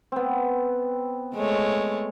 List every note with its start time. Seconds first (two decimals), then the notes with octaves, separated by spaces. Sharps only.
0.12 B3 C4
1.35 G#3 A3 C#5